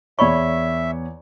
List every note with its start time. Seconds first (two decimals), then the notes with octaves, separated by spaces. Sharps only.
0.19 E2 C#5 D5 E5 B5 C#6